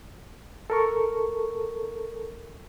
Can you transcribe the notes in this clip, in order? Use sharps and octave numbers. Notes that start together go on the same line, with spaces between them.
A4 A#4 C#6